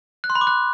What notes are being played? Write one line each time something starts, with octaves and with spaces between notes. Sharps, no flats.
F#6
C6
B5
D6
F#6